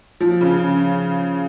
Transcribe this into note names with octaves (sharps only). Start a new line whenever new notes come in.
F3
C#3